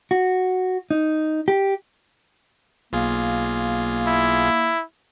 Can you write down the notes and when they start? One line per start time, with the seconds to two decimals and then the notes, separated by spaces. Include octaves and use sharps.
0.11 F#4
0.91 D#4
1.48 G4
2.93 B1 A#3 F4 G#4
4.07 E4